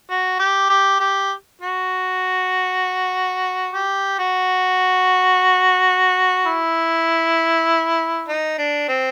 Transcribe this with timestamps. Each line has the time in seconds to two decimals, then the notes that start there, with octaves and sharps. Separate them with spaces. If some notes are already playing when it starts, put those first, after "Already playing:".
0.10 F#4
0.39 G4
0.70 G4
1.00 G4
1.61 F#4
3.73 G4
4.19 F#4
6.46 E4
8.28 D#4
8.58 D4
8.88 C4